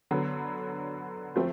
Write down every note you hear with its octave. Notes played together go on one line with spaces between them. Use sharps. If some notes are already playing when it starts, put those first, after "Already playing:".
D3 F#3 B3
F3 A3 C4